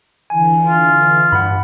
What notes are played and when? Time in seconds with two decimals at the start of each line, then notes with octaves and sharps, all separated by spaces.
0.30 D3 E3 G#5
0.67 F4
1.32 G2 F#5 B5